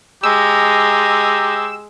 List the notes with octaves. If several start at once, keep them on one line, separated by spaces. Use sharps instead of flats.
G#3 G4 A#5 E6